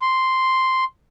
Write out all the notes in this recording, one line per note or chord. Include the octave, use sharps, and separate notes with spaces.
C6